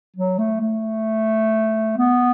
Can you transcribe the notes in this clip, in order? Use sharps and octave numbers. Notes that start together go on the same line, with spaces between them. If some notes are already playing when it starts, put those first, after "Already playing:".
F#3
A3
A3
B3